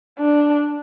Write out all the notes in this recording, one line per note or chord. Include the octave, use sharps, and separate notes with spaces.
D4